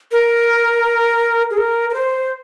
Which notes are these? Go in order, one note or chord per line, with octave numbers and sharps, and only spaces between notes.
A#4
G#4
A#4
A#4
C5